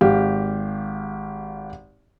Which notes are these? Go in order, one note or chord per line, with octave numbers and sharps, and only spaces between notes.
G#1 G4 F5